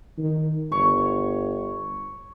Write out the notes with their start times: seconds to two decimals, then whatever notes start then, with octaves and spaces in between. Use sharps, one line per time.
0.18 D#3
0.72 G1 C#5 C#6